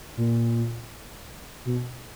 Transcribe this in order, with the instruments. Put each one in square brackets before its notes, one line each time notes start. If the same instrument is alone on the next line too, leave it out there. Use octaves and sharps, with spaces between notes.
[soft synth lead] A#2
B2